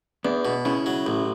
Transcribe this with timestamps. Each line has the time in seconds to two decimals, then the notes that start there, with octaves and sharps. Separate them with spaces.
0.25 E2 B3 D4
0.45 B2
0.65 C#3 C#4 E4
0.86 F#3
1.06 A1